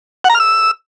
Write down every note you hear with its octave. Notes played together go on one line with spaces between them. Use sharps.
F#5
A#5
F6
E6